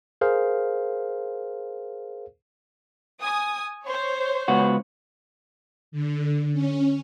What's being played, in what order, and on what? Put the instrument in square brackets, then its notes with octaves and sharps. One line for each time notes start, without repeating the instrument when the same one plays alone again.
[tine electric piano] G#4 A#4 C5 F5
[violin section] G#5 D#6
C5 C#5
[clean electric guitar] C#2 B3 F#4
[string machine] D3
C#4